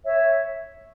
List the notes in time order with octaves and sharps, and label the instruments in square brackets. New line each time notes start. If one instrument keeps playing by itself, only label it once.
[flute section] C#5 E5